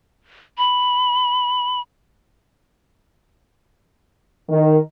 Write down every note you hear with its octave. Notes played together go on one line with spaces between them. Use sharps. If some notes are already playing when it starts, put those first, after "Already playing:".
B5
D#3